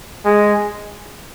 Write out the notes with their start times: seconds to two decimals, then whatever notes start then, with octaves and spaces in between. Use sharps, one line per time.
0.25 G#3